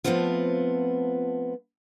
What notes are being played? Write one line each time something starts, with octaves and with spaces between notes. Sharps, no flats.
F3 F#3 A3 B3 C4 F4